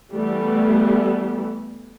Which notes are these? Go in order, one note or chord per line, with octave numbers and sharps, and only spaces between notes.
E3 G3 A3 B3